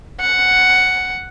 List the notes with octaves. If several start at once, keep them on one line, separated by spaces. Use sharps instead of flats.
F#5